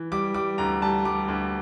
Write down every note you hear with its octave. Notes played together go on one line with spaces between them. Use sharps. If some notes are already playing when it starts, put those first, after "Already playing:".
Already playing: E3
G3 D6
G3 D6
D2 A#5
G3 A5
G3 D6
D2